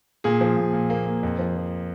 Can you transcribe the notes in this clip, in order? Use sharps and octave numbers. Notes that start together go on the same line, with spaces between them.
A#2 G#4
F3
A#2
A#2
A#3
A#3
F2
F3
F3